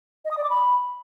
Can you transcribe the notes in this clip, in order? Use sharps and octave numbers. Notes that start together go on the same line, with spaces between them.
D#5
D#6
D5
D6
B5